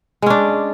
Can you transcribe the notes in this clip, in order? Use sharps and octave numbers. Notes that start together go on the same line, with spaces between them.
G#3 C#4 D4